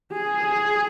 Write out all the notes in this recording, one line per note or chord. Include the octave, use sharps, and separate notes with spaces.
G#4